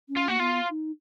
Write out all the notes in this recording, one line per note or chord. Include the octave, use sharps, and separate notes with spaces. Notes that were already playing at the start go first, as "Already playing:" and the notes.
C#4
F4
A#3 F#4
B3 F4
D#4